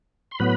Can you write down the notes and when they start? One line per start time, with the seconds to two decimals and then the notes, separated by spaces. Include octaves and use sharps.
0.31 C6
0.39 A2 F#3 B3 B4 B5